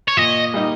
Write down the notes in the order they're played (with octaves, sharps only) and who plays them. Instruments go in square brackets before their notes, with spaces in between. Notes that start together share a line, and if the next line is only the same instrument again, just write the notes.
[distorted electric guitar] C#5
[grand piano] A#2 [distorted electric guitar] D#5
[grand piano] G3 A#3 D#4